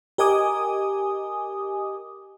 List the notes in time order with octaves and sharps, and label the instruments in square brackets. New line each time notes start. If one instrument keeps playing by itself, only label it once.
[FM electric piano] G4 A#4 D#5 G#5 D6 D#6